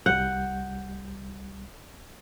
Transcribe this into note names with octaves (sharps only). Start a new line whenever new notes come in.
C2 G3 F#5 G6